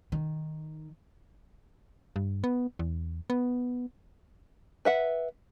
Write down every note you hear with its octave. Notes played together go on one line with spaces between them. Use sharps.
D#3
G2
B3
E2
B3
B4 E5 F#5